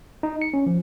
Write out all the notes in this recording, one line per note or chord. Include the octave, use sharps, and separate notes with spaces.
D#4
C#7
C#4
F3